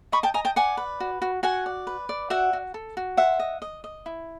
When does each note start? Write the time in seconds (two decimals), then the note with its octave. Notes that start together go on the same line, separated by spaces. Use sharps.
0.12 D#5 B5 C#6
0.23 G5 A5
0.34 D#5 G#5 A#5
0.45 G5 A5
0.56 D5 F#5 G#5
0.77 B4
1.00 F#4
1.22 F#4
1.43 F#4 F#5 G#5
1.66 D5
1.87 B4
2.09 D5
2.30 F#4 E5 F#5
2.53 F#4
2.74 A4
2.97 F#4
3.17 C5 E5 F#5
3.39 D#5
3.62 D#5
3.84 D#5
4.06 E4